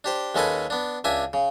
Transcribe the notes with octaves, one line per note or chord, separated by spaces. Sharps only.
D4 G4 C5
D#2 G#3 C#4 A4 B4 G#5
B3 D4
C#2 D4 E5 G#5
C#3